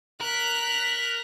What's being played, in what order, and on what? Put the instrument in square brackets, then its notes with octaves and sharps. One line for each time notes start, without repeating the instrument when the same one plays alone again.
[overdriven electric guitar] A#4 [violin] F#6 B6